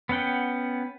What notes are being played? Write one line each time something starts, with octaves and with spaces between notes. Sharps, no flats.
B3 C#4 F#5 G5